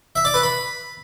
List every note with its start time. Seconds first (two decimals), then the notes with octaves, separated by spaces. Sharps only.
0.16 E5
0.25 D5
0.34 B4
0.43 B5